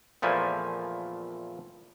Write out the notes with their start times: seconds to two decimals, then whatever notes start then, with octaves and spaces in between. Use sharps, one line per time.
0.22 E2 A#2 F3 A3 E4 G#5